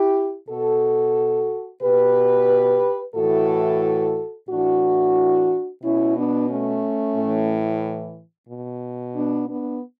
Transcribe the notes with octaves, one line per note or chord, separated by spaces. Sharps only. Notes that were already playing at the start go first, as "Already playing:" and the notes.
Already playing: E4 G4
B2 F#4 A4
B2 G4 B4
A2 E3 F#4 A4
A2 E3 D4 F#4
B2 C#4 E4
B3 D4
A3 C#4
A2 E3
B2
B3 D4
B3 D4